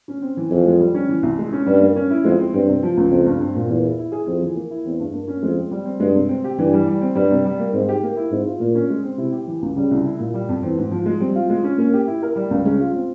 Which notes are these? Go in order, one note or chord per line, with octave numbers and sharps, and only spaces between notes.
C#4
C4
E3
F2 E3
G#3
G3
C#4
E3
C2
G#3
C#4
G2 G3
A#3
C#4
E4
F2 G#3
C4
G2 C4
C3
F3
C#2
F2 C4
G2
C4
A#2
E2 A#3
E4
E4
G#4
F2 C4
E3
A#3
E4
E2 C4
G2
A#3
C#4
F2 G#3
C4
G3
C4
G2 G#3
C3
C4
G4
G2 E3
G3
G3
C4
G2 G3
C3
G3
A#3
G#2 C4
G4
A#3
E4
G#2 C4
F4
A#2 A#3
C#4
G#3
C4
C3 E4
G4
E3
C#2
C#3 G3
C2
E4
A#2
G3
F2
E3 C4
G#2
F3
G#3
G3 C4
F4
G#3
C#4
A#3 C#4
G4
E4
A#4
G3
C#2
G#3 C#4
F4
C4